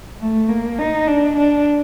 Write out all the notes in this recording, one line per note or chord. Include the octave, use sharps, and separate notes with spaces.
A3
A#3
D#4
D4
D4